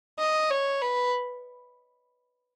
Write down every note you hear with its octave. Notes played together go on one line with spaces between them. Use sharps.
D#5
C#5
B4